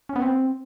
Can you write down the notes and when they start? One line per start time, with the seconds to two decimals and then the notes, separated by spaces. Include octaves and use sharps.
0.09 C#4
0.16 B3
0.22 C4